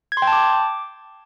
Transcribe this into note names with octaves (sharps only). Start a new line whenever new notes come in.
G#6
C6
G5
A5
D6